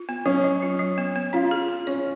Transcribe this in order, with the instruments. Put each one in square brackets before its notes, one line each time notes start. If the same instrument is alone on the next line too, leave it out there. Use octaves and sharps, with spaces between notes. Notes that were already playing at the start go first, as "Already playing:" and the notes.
Already playing: [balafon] F4
B3
[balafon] F#3 [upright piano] C#4
[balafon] F#3
F4
F#3
B3
B3
[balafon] C#4 [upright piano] F4
[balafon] G#4
G#4
[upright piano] C#4 [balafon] C#5